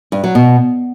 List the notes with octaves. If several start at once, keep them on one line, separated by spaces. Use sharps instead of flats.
G2
F#3
B2